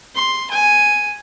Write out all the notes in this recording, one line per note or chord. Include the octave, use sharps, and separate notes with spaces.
C6
G#5